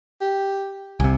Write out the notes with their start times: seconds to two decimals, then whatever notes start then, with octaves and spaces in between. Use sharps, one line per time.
0.21 G4
1.00 C2 C3 G#5